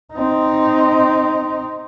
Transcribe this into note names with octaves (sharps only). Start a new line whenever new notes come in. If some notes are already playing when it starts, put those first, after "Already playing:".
C4 D#4